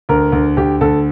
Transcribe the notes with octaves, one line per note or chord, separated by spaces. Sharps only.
D2 A#4
D2
D2 G4
D2 A4